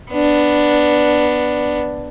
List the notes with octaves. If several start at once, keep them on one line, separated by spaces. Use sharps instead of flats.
B3 D4